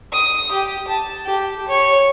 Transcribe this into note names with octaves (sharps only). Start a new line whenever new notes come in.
D#6
G4
A5
G4
C#5